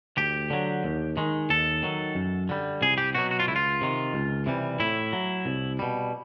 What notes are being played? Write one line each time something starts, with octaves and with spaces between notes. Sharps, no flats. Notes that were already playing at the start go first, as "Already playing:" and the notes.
D2 G4
D3 F#3
D#2
D#3 G#3
D#2 A4
D#3 F#3
F#2
D3 G3
C2 G#4
G4
B2 F#3 F#4
F#4
F4
C#2 E4
F4
C3 D#3
C#2
C3 E3 G3
A2 E4
F#3
C2
B2 G3